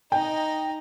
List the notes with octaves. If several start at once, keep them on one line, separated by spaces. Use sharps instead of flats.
D#4 D#5 G5